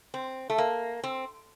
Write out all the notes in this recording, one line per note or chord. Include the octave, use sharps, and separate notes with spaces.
C4
A3
A#3
C4